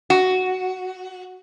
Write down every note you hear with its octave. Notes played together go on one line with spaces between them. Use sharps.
F#4